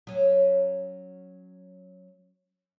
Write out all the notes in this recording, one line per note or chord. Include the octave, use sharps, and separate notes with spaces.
F#3 C#4